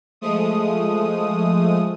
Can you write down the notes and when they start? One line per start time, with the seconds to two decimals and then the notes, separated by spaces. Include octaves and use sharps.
0.21 F3 G#3 A3 D#6